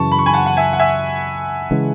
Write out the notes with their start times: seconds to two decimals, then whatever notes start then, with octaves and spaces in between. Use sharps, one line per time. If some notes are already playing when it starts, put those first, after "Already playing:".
Already playing: F#2 C#3 E3 A5 C#6
0.12 B5
0.19 C#6
0.26 G#5 B5
0.33 F#5 A5
0.46 F#5
0.57 E5 G#5
0.73 F#5
0.79 E5 G#5
1.71 C#3 E3 G#3